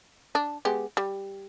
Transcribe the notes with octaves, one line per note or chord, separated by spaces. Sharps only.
D4
G#3 B3 G4
G3